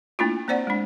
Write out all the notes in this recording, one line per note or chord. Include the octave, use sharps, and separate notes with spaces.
A3 A#3 D4 E4 F4
A#3 C4 C5 D5 F#5
G#3 D4